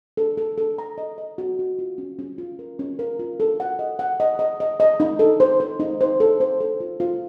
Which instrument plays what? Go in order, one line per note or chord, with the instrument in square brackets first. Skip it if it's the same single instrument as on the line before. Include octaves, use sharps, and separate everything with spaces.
[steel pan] A4
A4
A4
A#5
D#5
D#5
F#4
F#4
F4
C#4
C#4
F4
A#4
C#4
A#4
F4
A4
F#5
D#5
F#5
D#5
D#5
D#5
D#5
D#4
A4
C5
C5
D#4
C5
A4
C5
A4
F4
F4